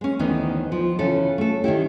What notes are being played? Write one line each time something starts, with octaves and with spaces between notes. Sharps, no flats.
G#3 C#4
D2 D#3 E3 B3 D#4
F3
C#3 E3 A4
A3 A4
D#3 C#4 E4 G4